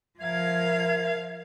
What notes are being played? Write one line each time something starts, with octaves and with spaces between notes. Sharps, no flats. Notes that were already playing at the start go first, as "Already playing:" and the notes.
F3 A#4 E5 F5 G#6